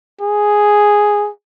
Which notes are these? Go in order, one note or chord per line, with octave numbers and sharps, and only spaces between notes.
G#4